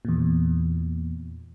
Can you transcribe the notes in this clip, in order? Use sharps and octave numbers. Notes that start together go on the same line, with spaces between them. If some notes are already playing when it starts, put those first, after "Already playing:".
E2 A#2